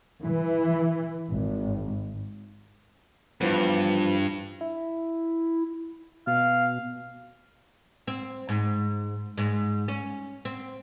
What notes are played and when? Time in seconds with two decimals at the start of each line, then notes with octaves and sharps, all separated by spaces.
0.24 E3
1.32 G#1
3.41 G2 E3 F3 B3
4.61 E4
6.27 B2 F5
8.08 C4
8.49 G#2
9.37 G#2
9.88 C#4
10.45 C4